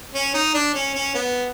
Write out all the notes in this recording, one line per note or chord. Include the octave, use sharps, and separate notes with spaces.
C#4
D#4
D4
C#4
C#4
B3